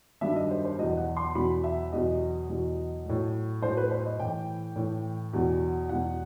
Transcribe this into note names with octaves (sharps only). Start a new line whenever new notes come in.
G2 D#3 F#3 E5
D#5
C5
C5
E2 B2 F#3 D#5
F#5
C6
E2 B2 F#3 B5
E5
E2 B2 F#3 D#5
E2 B2 F#3
A2 F#3
A2 F#3 C5
B4
C5
D#5
A2 E3 G5
A2 E3
E2 B2 F#3
E2 B2 F#3 F#5